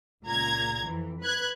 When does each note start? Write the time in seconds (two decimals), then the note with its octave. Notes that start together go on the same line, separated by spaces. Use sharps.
0.24 C#2 A#2 A#5 G#6
0.84 F2 E3
1.22 B4 F#6 G#6